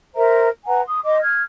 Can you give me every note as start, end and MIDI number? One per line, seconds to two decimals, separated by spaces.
0.15 0.47 70
0.15 0.47 72
0.15 0.47 76
0.15 0.47 82
0.66 0.82 71
0.66 0.82 78
0.66 0.82 80
0.66 0.82 82
0.87 0.99 84
0.87 0.99 87
1.05 1.20 75
1.05 1.20 84
1.05 1.20 86
1.21 1.43 89
1.21 1.43 92